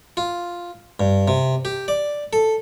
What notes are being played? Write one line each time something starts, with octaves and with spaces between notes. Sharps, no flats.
F4
G2
C3
G4
D5
A4